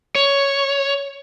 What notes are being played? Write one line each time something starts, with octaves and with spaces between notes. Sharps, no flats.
C#5